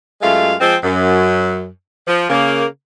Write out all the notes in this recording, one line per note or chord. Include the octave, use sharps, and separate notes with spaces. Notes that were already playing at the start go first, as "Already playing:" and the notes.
F#2 G#3 A3 F4 F5
F3 G#3 C4
F#2
F3
C#3 A#3